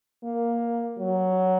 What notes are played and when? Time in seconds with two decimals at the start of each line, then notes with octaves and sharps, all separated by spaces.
0.24 A#3
0.99 F#3